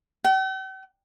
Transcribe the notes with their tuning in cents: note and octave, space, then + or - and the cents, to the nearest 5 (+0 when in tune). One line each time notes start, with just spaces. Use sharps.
G5 -45